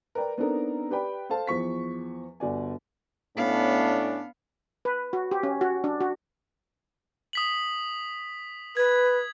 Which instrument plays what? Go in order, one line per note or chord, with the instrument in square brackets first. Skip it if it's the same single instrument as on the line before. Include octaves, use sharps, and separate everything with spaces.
[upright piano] A#4 B4 D5 G5
B3 C4 D4 D#4 A4 A#4
G4 B4 D5 G5 B5
A4 C5 F5 A5
E2 F3 C#6 B6
G1 F#4 D5 G#5
[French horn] A2 [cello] B3 F5 [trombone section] C#4 D4
[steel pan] B4
F#4
G4
C#4
F#4
D4
F#4
[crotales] D#6 B6 F#7
[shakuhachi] B4 [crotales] G#6